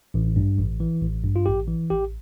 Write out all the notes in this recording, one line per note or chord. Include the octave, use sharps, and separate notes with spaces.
A1
G2
A1
E3
A1
G2
F4
A1 G4
E3
A1 G4